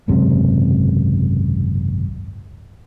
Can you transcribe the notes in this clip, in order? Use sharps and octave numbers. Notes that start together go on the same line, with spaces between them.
G#1 C#2 F#2 C3